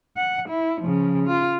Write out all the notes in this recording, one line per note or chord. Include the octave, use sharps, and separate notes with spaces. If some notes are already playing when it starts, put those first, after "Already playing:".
F#5
E4
C#3 F3
F4